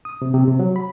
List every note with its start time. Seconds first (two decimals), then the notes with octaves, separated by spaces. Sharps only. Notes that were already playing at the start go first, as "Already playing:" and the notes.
0.05 D#6
0.22 C3
0.34 C3
0.48 C3
0.60 F#3
0.76 B5